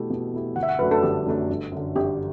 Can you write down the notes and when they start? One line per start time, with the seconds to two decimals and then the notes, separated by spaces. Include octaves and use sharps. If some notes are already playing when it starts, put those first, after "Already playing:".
Already playing: B2 A3 E4 G4
0.10 B2
0.34 A3 E4 G4
0.56 G1 F#5
0.63 E5
0.69 F#5
0.79 F#2 F#3 A3 D4 B4
0.91 A4
1.03 G1 G4
1.26 F#2 F#3 A3 D4
1.49 G1
1.72 F#2 D3
1.96 G1 G4